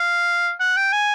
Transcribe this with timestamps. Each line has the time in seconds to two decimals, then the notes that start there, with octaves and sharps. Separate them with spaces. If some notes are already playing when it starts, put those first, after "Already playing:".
Already playing: F5
0.60 F#5
0.77 G5
0.93 G#5